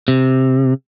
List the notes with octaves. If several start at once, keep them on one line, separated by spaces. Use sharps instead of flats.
C3